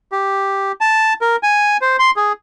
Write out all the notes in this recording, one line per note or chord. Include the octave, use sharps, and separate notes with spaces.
G4
A5
A#4
G#5
C5
C6
G#4